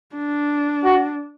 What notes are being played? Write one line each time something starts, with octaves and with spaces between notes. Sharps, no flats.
D4
F#4